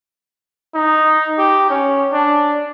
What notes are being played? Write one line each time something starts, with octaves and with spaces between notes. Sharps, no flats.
D#4
G4
C#4
D4